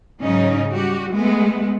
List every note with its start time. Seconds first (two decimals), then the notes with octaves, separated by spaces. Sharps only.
0.21 G#2 C#3 F#3 C#4 D#4
0.70 G3 F#4 G4
1.10 G#3 A3 B3